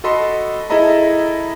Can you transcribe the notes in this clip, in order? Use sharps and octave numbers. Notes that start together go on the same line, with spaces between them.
F#4 A4 D#5 B5 C6
E4 G#4 A4 D#5 A#5 B5